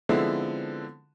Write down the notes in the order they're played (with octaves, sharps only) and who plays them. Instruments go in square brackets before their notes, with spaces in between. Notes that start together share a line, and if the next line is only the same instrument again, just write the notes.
[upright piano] D3 F3 G#3 B3 C4 E4